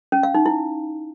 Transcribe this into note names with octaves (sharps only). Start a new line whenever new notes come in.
C#4
F5
D#4
E4